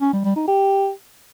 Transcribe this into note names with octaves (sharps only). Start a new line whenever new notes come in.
C#4
G3
G3
D#4
G4